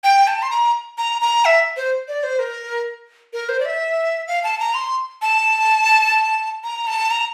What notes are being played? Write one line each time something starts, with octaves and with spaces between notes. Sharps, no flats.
G5
A5
C6
A#5
A#5
A#5
E5
C5
D5
C5
A#4
A#4
C5
D5
E5
F5
A5
A#5
C6
A5
A#5
A5
A#5